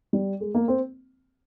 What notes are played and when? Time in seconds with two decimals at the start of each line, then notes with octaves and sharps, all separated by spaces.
0.13 G3
0.40 G#3
0.55 A#3
0.68 C4